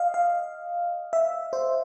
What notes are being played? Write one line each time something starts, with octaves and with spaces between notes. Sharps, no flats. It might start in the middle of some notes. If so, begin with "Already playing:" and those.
Already playing: D#5 F5
F5
E5
C5